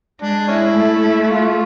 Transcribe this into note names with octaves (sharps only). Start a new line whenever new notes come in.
G#3 D4
C#4 E4
A3
E4
F4